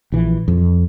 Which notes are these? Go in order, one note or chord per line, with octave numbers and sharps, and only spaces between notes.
A#1 E3
F2